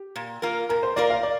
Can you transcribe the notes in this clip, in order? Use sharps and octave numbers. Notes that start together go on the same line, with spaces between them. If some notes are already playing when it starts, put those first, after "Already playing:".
Already playing: G4
A#2
A#3 F4 A#4
A#2 A#4
C5
A#3 F4 A#4 D5
F5
D5